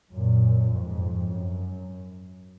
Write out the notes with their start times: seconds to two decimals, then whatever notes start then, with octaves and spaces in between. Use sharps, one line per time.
0.13 F#2 A#2
0.71 F2 G#2
1.29 F#2